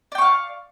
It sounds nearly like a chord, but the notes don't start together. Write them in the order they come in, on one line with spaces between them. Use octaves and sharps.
D5 G5 C#6 F5